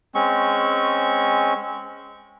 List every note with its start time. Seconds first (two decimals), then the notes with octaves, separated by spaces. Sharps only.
0.15 G#3 C4 C#4 C#6